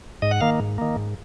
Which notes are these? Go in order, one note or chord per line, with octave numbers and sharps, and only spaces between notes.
G#2 D#5
F#5
D#3 A#3 F5
G#2
D#3 A#3
G#2